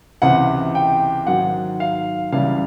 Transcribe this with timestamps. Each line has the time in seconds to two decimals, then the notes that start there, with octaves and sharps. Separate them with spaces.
0.22 C#2 C3 E3 F#5
0.75 G5
1.27 G#2 D#3 F#3 F#5
1.80 F5
2.32 C#2 C#3 E3 G3 F5